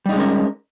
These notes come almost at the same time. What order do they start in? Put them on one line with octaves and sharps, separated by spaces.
G3 D#4 G#3 C#4 A#4